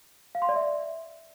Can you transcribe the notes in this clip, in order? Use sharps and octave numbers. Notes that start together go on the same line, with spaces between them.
F5
C6
D5
E5